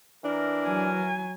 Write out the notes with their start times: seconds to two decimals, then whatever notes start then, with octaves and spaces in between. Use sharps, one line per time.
0.24 E3 D4 A#4
0.67 F#3 G#5